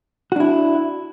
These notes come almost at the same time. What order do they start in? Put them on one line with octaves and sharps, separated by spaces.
F#4 D4 E4